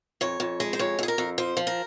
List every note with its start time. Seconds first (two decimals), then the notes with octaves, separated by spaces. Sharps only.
0.21 F2 C#5
0.40 F2
0.60 G#3
0.73 C5
0.79 F2 C#5
0.99 F2 G#4
1.08 A#4
1.18 F2
1.38 F3 C5
1.57 F3
1.67 A#4